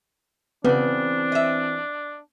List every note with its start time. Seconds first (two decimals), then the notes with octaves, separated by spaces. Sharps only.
0.65 C#3 E3 B3 C4 D4 D5
1.32 D#5 E5